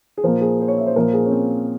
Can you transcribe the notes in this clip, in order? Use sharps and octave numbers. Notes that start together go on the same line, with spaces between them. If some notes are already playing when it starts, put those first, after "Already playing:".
G#4
A#2 F3 A#4
G#4
C5
C#5
E5
C5
A#2 F3 A#4
G#4
C#4
C4